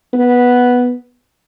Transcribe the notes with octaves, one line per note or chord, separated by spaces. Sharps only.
B3